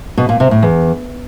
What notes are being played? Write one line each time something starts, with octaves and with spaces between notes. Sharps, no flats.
B2
A#2
C3
A2
E2